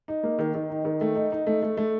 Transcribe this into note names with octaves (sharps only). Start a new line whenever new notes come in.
D#4
A#3
D#3
D#3
D#4
D#3
A3
D#4
D#4
A3
A3
A3